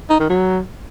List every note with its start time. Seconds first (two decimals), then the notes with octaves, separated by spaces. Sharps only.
0.10 D#4
0.20 D#3
0.30 F#3